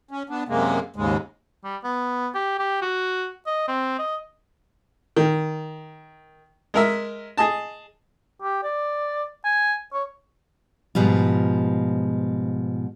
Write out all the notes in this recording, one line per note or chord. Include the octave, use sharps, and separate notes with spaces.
C#4
B3 D4
F#2 C3 G#3 A#3
D#2 G#2 C#3 G#3
G3
B3
G4
G4
F#4
D#5
C4
D#5
D#3
G#3 A#4 E5
G#4 D#5 A5
G4
D5
G#5
C#5
G#2 B2 F3 G3 F4